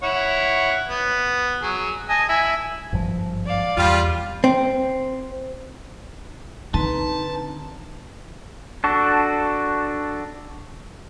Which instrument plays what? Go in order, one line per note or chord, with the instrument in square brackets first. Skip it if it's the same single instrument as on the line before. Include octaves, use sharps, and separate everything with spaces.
[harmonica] E4 C#5 F#5
B3
F#3 G#4
D#5 G#5 A5
E4 G#5 E6
[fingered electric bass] G#1 G2 F3
[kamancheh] D5 F5
[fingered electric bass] E2 [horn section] G3 F4
[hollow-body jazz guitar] C4
[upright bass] D3 [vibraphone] C4 B4 A#5 [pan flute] D#4 [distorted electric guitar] A5
[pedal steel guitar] D4 F#4 A4